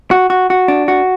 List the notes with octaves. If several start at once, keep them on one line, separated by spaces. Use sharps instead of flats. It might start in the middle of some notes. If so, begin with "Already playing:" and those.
F#4
F#4
F#4
D4
F#4